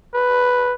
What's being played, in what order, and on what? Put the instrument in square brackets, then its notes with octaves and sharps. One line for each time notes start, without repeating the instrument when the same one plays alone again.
[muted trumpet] B4